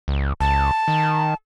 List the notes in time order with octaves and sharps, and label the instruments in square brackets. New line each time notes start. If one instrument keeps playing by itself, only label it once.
[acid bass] C#2
[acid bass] C#2 [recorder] A5
[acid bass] D#3